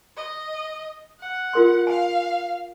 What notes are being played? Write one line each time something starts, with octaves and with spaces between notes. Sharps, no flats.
D#5
F#5
F4 A#4 C6
F5 G#5